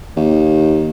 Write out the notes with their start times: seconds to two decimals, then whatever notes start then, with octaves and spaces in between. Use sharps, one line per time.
0.17 D#2